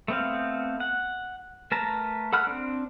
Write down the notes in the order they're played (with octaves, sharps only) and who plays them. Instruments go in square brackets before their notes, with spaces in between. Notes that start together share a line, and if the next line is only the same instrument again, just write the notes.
[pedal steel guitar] A3 B3 C4 F5
F#5
A3 A#4 B4 A5 A#5
A4 F#5 B5 F6 F#6
C4 D4